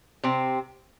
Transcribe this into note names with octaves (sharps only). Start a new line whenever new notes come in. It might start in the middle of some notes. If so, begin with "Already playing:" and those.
C3 C4